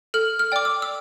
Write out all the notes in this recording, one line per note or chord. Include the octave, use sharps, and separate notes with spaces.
A4 F6
F6
D5 G5 D6
E6
E6